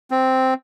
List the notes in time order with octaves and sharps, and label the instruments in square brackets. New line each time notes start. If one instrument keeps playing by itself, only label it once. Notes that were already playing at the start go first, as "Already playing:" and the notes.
[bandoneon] C4